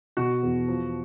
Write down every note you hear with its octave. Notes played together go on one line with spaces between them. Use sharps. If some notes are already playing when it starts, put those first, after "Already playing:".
B2 F#4
E2
F3